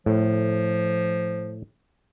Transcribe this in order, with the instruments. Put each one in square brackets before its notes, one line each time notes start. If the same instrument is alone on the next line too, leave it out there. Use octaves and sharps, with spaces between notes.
[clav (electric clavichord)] A2 [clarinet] F3